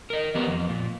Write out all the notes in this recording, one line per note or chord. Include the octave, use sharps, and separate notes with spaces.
A#4 D#5
E3 B3 G4 B4 A#5
F2
A#2